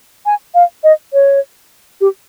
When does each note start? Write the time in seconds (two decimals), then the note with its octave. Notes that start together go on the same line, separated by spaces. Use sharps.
0.26 G#5
0.55 F5
0.84 D#5
1.13 C#5
2.01 G4